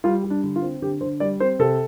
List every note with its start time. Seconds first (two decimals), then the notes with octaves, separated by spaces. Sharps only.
0.04 G3 F4
0.24 G3
0.30 D4
0.44 D3
0.56 F4
0.62 C4
0.82 D3 G4
1.01 D3 C5
1.20 G3 D5
1.40 C4 C5
1.59 C3 A4